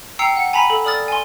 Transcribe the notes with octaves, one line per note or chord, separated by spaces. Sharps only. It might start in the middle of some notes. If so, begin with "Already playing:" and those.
G5 A#5 E6 C7 C#7
F#5
G#5 A#5 B5 B6
A4
A4 D5 D#6 F6 A6
G#5 C6